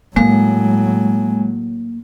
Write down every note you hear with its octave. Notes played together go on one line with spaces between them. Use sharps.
A2 F#3 G#3 A#3